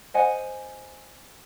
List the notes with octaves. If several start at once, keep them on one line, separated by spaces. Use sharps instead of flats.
C5 D#5 F#5 G#5